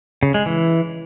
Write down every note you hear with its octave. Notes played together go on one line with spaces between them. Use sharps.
C#3
G#3
E3